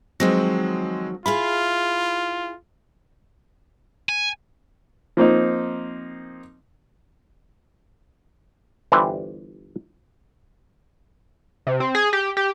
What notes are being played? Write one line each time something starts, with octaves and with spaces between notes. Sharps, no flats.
D#3 F3 F#3 G#3 C4 A#6
E4 F4 G#4 F5 B5
G#5
F3 A#3 C4 D#4
G1 E3 G3 G4 C5
C3
C4
G#4
G4
G4